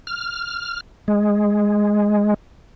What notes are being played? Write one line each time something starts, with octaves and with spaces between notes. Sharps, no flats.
F6
G#3